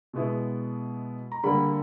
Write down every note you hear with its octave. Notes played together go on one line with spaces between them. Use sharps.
B2 G#3 B3 E4
A#5
D3 G3 A#3 B5